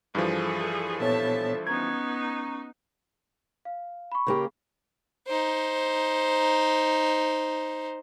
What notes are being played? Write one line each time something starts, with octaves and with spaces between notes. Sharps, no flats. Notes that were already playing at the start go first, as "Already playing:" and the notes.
G2 E3 F3 G#4 A4
A#2 B3 A4 C#5 E5 A5
B3 C#4 D#4 A#5 C#6 G#6
F5
B5 C#6
C#3 A#3 G4
D#4 C5